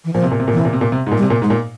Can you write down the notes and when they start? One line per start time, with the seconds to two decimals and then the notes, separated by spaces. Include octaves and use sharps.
0.04 E3
0.13 A#2 F3
0.22 C3
0.31 A#2
0.40 C3
0.48 A#2
0.52 C3 E3
0.65 A#2
0.73 C3
0.81 A#2
0.92 C3
1.07 G#2
1.11 A#2
1.17 G3
1.22 C3
1.30 A#2
1.42 G#2 G#3
1.50 A#2